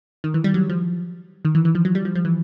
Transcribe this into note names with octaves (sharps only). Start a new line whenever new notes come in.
D#3
E3
G3
F#3
F3
D#3
E3
E3
F3
F#3
G3
F3
F3
E3